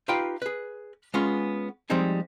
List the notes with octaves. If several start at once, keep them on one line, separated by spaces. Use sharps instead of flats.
D#4 F4 G4 B4 F5 G5
G#4 B4
G#3 B3 C#4 F4
F3 G3 G#3 C4 D#4 G#4